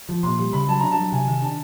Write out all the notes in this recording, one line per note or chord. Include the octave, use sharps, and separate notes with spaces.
F3
A#2 C6
G3
C#3 B5
F#3 A5
D4 A#5
A5
F#3
C3 G#5
D#3
D4 A5